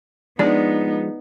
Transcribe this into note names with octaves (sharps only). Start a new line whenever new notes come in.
F3 G#3 B3 D4 D#4 D5